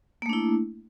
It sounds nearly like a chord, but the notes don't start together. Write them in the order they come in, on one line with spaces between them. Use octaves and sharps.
A#3 A3 D4 E4